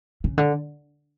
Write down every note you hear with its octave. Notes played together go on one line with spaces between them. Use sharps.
C#3
D3